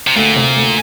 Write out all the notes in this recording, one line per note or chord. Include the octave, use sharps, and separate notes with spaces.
C3
D2 A#2
C3
D2